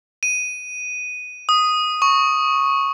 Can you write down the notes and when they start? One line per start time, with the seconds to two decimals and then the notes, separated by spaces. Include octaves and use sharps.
0.23 D#7
1.49 D#6
2.02 C#6